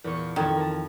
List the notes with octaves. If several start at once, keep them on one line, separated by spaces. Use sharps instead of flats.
E2 A#2 C#6
F2 D#3 A4 G#6
A#4 G#5 A5